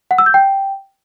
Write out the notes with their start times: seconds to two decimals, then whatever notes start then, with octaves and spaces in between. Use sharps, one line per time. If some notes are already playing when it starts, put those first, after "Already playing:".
0.11 F#5
0.18 E6
0.26 G6
0.34 G5